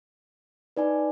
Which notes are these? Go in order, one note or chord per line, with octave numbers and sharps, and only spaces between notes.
D#4 B4 D5 G#5